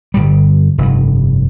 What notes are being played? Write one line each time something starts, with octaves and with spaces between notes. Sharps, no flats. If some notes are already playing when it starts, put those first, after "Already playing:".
G1 C2 G3
F1 G2